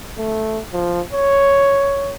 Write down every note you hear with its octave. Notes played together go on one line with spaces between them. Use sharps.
A3
F3
C#5